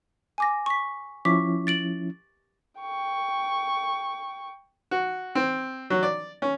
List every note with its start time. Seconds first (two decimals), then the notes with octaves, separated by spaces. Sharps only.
0.38 G#5 D6 A#6
0.66 C#6 B6
1.25 F3 C#4 E4 C#6 D6 B6
1.67 A6 D7 F#7
2.81 G5 C#6
4.91 F#4
5.35 C4
5.90 F#3
6.03 D5
6.42 C#4